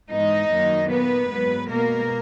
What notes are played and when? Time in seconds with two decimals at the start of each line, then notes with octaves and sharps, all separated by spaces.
0.11 G#2 E3 G#3 B3 D#4 D#5
0.50 F#2 D#3 F#3 A#3
0.90 A#2 A#3 B3 B4
1.30 G#2 F#3 B3
1.69 B2 G#3 A#3 B3 A#4